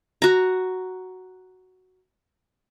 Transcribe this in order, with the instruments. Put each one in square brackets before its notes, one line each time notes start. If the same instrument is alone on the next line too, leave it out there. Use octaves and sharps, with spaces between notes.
[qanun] F#4 A#5